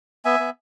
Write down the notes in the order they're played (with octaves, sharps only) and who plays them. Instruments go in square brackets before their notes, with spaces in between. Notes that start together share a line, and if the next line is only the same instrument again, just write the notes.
[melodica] B3 E5 G#5
B3